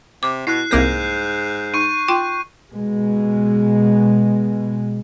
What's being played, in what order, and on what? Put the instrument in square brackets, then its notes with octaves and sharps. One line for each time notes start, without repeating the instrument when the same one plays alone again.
[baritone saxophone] C3 [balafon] D6
[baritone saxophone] B2 [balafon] E4 [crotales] F#6 C7
[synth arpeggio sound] C2 A#3 A#6 [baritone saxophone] G#2 [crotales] G6
[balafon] D#4 [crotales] C#6 D#7
[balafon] F4 G5 C6
[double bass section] B2 G#3